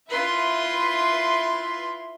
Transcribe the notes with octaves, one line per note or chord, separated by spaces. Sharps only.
E4 F4 B4 E5 C6